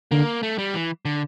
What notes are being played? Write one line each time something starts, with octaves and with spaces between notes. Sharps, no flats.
D3 A#3
A3
G3
E3
D3